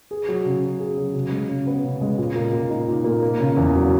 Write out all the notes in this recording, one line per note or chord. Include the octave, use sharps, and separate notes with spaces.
G#4
F#3
C#3
C#4
G#4
F#3
C#3
G#3
C#3
B3
C#3
G#3
A#2
A#3
A#2
D#4
A#2
A#3
A#3
C#3
E2
F#3